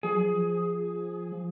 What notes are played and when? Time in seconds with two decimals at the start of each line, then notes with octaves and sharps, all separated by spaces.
0.03 F3 G#4
0.13 F#3
0.23 F3
1.32 F3